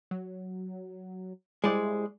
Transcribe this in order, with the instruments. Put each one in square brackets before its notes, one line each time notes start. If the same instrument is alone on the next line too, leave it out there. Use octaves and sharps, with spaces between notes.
[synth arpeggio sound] F#3
[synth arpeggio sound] G3 E4 C5 [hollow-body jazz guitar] G#3 D5